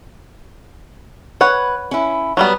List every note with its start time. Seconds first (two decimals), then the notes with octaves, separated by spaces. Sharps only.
1.41 B4 C#5 F#5
1.91 C#4 E4
2.37 F#3 G3 B3